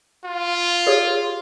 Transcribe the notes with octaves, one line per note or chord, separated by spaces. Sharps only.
F4
G4 G#4 C#5